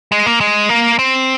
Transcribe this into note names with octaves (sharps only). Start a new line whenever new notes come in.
G#3
A#3
G#3
A#3
C4